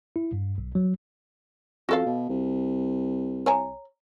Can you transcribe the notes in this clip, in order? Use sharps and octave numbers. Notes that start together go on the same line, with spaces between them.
E4
G2
B1
F#3
F2 F#4 A4 F5
B2
C2
C#5 G#5 A#5